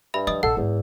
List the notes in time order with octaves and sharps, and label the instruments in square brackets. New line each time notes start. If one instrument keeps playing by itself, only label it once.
[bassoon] G2 [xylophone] E5 B5
[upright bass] F3 [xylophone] D#5 D#6
[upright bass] A#1 [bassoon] A4 [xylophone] F#5
[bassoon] E2 [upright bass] G#2